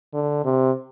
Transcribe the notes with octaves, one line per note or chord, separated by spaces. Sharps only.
D3
C3